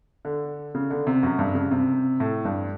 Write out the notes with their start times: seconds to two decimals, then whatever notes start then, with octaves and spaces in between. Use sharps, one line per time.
0.25 D3
0.75 C#3
0.90 D3
1.07 C3
1.23 F#2
1.39 G2
1.55 C#3
1.71 C3
2.20 A2
2.45 G2